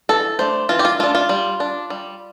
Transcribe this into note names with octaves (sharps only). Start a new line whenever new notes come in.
E3 A4
A3 D4 C5
E3 F4
G4
F4
A3 D4 F4
F4
G3
D4
G3